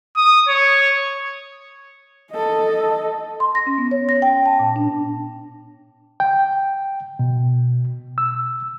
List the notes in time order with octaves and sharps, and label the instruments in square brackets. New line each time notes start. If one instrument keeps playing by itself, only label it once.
[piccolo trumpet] D#6
C#5
[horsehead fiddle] A4 D#5
[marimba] C6
A#6
C#4
B3
C#5
A#6
G5
A5
A#2
D4
[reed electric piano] G5
B2
E6